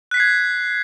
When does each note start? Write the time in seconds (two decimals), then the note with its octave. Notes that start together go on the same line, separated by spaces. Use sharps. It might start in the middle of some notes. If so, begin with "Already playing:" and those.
0.11 F#6
0.14 B6
0.17 C7
0.20 G#6